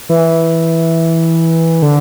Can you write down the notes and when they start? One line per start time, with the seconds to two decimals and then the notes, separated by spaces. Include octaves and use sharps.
0.09 E3
1.82 D3